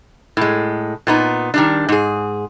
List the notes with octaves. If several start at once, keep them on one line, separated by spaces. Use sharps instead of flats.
A2 G#3
A#2 B3 D#4
D#3 G3 D4
G#2 G#4